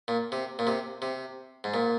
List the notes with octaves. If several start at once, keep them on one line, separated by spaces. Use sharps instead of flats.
A#2
C3
A#2
C3
C3
G#2
A#2